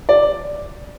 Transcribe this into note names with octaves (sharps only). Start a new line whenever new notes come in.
D5